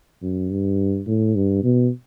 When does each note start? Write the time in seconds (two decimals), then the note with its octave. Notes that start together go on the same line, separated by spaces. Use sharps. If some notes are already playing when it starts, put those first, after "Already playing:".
0.22 F#2
0.51 G2
1.07 A2
1.35 G2
1.63 B2